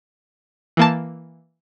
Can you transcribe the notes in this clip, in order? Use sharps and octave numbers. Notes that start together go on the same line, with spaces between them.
E3 A#3 A5